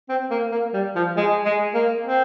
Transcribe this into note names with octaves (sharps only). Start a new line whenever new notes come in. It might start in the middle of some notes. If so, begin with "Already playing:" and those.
C4
A#3
A#3
G3
F3
G#3
G#3
A#3
C4